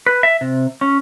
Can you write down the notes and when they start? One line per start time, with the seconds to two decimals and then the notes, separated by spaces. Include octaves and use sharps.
0.06 B4
0.23 E5
0.41 C3
0.81 C#4